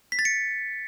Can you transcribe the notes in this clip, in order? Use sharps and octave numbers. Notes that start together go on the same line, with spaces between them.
B6
A6
C#7